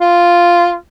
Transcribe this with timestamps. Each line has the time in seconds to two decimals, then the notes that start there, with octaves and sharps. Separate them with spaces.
0.01 F4